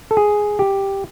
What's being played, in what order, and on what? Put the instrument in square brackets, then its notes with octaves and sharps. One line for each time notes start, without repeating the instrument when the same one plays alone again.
[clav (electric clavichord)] A4
G#4
G4